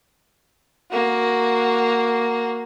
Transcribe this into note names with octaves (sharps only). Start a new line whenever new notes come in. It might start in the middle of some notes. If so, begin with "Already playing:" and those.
A#3 F#4